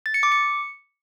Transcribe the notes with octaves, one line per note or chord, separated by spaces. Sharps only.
A6
C#7
D6
C#7